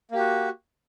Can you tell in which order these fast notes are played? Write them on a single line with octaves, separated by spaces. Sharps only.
A#3 G4 F#4